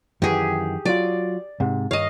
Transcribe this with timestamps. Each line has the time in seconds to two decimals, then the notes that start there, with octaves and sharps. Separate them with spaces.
0.22 F#2 D#3 E3 G4 G#4
0.85 F#3 F4 D5
1.60 G#2 C3
1.91 G2 D#3 C#5 D#5 F5